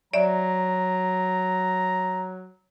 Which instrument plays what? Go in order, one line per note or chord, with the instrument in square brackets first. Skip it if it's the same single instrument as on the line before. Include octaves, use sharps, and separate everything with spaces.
[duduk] F#3 [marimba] D5 E5 [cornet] A#5